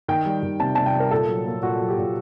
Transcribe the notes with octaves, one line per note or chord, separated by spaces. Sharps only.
D#3 G5
G3
D#3
C3 A5
C3 A5
G5
G3
A#4
A#2 A4
F#3
A#3
A#2 F#4
F#3
G4
A#2